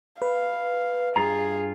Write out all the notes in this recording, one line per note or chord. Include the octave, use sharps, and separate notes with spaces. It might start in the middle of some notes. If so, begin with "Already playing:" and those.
B4 F5
G2 F4 G#4 A#5